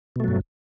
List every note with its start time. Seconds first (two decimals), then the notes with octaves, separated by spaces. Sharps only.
0.16 B2
0.20 A3
0.24 F#3
0.28 G2